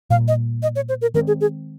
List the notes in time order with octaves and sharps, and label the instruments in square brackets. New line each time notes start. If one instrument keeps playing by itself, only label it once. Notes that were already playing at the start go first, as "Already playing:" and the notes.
[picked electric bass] A#2 G3 A#3 [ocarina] F5
[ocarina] D#5
D#5
C#5
C5
A#4
[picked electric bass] D#3 G#3 C4 [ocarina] A#4
[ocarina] G#4
G#4